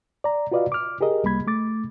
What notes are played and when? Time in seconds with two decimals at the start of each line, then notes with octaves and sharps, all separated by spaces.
0.24 D5 A#5
0.52 F4 F#4 B4 D5 D#5 F5
0.72 D6 F6
1.01 G4 G#4 A#4 D#5
1.24 C2 G3 A#3 B5 G#6
1.47 A3 D6 A6